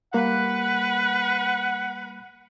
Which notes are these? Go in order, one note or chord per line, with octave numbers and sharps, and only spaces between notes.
G3 A#3 B4 F#5